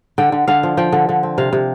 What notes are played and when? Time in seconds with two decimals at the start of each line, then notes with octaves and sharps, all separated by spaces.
0.18 D3 G5
0.32 D3
0.48 D3 F5
0.63 F3
0.77 F3 G5
0.92 D3
1.09 D3
1.23 C4
1.38 C3 F5
1.53 C3